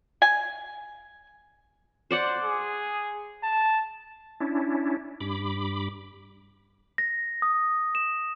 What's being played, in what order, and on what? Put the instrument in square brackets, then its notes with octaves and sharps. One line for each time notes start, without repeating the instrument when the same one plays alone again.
[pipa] G#5
[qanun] C5 D5 F#5
[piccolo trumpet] G#4
A5
[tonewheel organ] C#4 D4 E4
G2 B5 D6
[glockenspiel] A#6
D#6
E7